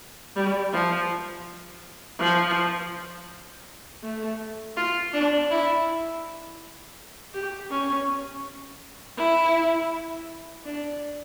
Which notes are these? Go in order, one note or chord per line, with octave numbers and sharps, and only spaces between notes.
G3
F3
F3
A3
F4
D4
E4
G4
C#4
E4
D4